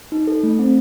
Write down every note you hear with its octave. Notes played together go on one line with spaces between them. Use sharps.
D#4
A4
A3
C4